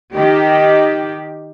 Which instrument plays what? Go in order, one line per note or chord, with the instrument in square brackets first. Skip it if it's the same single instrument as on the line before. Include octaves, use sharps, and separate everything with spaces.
[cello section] D#3 G4